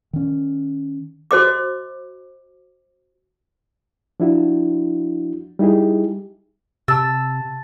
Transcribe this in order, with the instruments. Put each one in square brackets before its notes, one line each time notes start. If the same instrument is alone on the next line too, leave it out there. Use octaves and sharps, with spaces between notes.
[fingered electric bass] D#3 C#4
[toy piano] F#4 C5 D#5 D6
[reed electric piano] F3 D4 E4 F#4
G3 D#4 E4 G4 G#4
[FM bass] C3 [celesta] A5 A6 [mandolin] E6